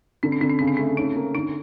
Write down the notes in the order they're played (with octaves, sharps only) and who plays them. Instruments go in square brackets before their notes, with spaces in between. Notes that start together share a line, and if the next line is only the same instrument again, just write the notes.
[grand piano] D3 [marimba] C4
[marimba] C#4
[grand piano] D3 [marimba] C4
[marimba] C#4
[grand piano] C#3 [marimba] C4
[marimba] C#4
[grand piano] A3 [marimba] C4
[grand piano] C#4 [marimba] D#4
[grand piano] A#3
[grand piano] D3 [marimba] D#4